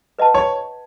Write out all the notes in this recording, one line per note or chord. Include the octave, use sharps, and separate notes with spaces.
B4 D#5 F#5 A5
C#5